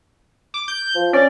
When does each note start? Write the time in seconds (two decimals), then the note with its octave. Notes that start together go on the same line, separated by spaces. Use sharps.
0.54 D6
0.68 G6
0.95 F3
1.13 C#4 D5